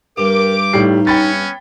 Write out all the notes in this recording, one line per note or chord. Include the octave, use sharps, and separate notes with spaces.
G2 G4 A#4 D6
A2 G3 D#4 C7
B3 C#4 C#5 G5 B5 A6